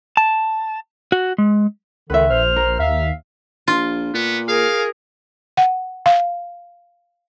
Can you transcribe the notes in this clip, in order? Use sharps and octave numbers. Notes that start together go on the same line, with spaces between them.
A5
F#4
G#3
C#2 D3 D#3 B4 E5
A#1 C5 F6
A#4
D#2 E5 F5
A#1 F4
A#2 B3
G#4 A#4 F5
F#5
F5